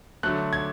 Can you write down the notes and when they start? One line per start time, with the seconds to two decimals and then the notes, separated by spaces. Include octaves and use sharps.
0.23 D3 F#3 A3 F#6
0.53 G#6